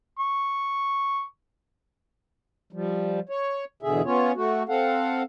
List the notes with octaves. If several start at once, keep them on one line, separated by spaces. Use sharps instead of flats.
C#6
F3 G3
C#5
E2 B2 D3 G#4 E5
B3 C#4 F4 C#5
A3 F#4
C4 A4 F5 F#5